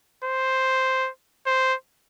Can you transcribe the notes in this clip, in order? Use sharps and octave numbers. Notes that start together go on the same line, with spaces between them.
C5
C5